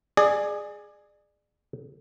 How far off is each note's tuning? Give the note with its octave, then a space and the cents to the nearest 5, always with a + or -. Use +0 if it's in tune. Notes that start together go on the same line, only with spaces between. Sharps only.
G#4 +0 D5 +30